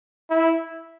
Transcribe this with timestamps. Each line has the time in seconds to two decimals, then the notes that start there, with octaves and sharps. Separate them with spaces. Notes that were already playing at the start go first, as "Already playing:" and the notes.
0.30 E4